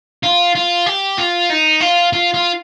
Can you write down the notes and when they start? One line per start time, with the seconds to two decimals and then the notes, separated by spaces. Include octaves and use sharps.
0.23 F4
0.55 F4
0.86 G4
1.18 F4
1.50 D#4
1.81 F4
2.13 F4
2.34 F4